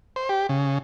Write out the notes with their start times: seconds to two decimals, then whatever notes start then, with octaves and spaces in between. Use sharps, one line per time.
0.16 C5
0.29 G4
0.49 C#3